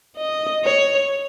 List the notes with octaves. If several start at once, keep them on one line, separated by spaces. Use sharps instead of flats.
D#5
C#5